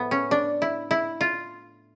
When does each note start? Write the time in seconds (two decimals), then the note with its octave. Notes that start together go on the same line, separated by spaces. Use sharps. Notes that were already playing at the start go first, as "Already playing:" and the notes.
Already playing: A2 F3 A3 B3
0.11 C#4
0.31 D4
0.62 E4
0.91 E4
1.21 F4